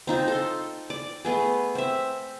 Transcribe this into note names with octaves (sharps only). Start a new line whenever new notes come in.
C4 D#4 F4
A4 C6
D5
A3 B3 G#4
C4 E5